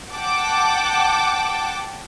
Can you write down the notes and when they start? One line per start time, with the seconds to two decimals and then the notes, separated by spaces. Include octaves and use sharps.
0.13 F#5 G5 A5 D6